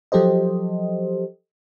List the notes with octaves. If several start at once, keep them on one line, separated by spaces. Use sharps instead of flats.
F3 F#3 G4 A4 C5 D#5